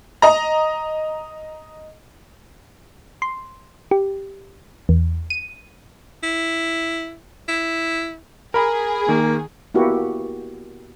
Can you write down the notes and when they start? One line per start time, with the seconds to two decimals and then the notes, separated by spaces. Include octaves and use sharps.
0.22 D#5 A#5
3.22 C6
3.91 G4
4.89 E2
5.30 D#7
6.23 E4
7.48 E4
8.54 G#4 A#4 B5
9.09 D#3 A#3
9.74 A#3 B3 E4 F#4 G4